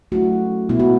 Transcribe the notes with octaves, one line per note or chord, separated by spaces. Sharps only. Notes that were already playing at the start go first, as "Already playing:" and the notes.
F#3 A3 C#4 E4 F#4
B2 G#3 B3 E4
F#4